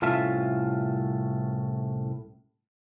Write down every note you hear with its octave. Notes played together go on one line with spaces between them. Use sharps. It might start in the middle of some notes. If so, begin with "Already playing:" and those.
C2 A2 C#4 F4 A4 E5